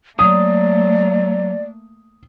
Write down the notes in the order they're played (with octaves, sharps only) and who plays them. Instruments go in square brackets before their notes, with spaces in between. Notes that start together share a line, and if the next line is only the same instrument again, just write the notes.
[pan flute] F#3 [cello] A3 A#3 [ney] D5 [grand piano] D#6